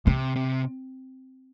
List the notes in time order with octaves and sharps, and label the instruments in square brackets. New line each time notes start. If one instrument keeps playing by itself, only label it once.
[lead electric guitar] C3 [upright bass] C4
[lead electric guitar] C3